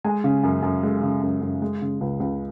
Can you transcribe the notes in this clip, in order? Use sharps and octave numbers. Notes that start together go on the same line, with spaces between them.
G#3 G#5
C#3
F#2
F#2
G#3
C#3
F#2
F#2
G#3
C#3
C#2
C#2